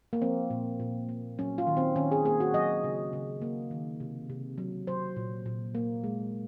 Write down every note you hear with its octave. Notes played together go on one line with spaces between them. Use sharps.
A#3
F3 C4
A#2
A#2
A#3
F#3 C#4
F4
D#3
C4
D#3 C#4
G#4
A#3 G#4
F#4
F#3 D#5
C#3
C#3
A#3
D#3
C3
C3
F#3
F#3 C5
A#2
A#2
A#3
G#3